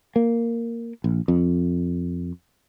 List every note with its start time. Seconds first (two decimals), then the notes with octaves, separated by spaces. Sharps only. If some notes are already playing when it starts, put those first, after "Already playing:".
0.16 A#3
1.04 A#1
1.28 F2